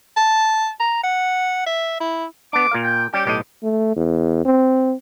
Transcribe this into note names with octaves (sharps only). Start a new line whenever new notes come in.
A5
A#5
F#5
E5
E4
B3 D4 D6
A#2 A#4 F5
G5
G3 C#4 G4 G5
B1 A2 G4 D#5
A3
E2
C4